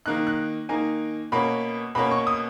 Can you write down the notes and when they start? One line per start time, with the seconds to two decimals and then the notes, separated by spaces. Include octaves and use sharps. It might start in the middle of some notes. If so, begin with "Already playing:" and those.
0.06 D#3 A#3 D#4 F#6
0.27 F#6
0.69 D#3 A#3 D#4 G#5
1.32 B2 A#3 C#4 B5
1.95 B2 A#3 C#4 B5
2.11 C#6
2.27 D#6